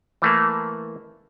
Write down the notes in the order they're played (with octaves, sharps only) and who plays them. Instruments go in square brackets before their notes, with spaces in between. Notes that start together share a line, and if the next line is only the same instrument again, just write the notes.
[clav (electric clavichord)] E3 A3 A#3